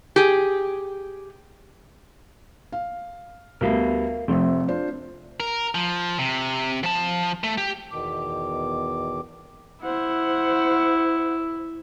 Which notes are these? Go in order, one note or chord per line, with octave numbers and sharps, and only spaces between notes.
G4 G#4
F5
D2 G3 B3 A#4 E5 F5
F1 F3 A3 C4 E5
D4 F4 C5
A#4
F3
C3
F3 A5
A3
G4
E2 B2 D#3 D6
E4 C5 F#5